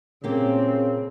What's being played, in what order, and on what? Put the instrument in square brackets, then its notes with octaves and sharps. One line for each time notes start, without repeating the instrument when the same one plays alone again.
[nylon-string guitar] A#2 A#3 G4 [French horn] C#3 [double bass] C4